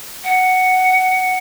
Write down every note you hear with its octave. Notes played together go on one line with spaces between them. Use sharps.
F#5